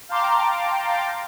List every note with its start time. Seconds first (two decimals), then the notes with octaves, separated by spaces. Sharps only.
0.09 F5 G5 A5 A#5 C6 D6